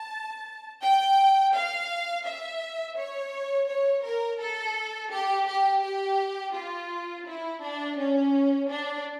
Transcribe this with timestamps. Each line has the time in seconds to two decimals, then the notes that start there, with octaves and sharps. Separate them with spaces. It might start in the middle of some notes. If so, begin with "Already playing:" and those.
Already playing: A5
0.82 G5
1.54 F5
2.25 E5
2.96 C#5
3.68 C#5
4.04 A#4
4.40 A4
5.11 G4
5.47 G4
5.83 G4
6.54 F4
7.25 E4
7.61 D4
7.98 C#4
8.68 D4